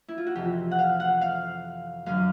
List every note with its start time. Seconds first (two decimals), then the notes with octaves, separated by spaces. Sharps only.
0.08 E4
0.18 F4
0.26 F#4
0.35 F2 C3 E3 G4
0.71 F#5
0.79 F5
1.00 F#5
1.21 F5
2.06 F#2 D3 F#3 F5